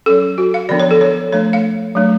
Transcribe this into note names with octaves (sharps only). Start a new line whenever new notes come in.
F#3 C#4 A4
F#4
F5
D3 F3 B3 D4 D5
C#5
A4
C#5
F3 A3 D4 C#5
F5
F#3 A3 D4